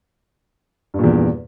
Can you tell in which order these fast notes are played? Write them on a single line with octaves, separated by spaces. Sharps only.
G2 A#2 E2